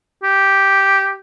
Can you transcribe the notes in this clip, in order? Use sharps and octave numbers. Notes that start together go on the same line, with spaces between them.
G4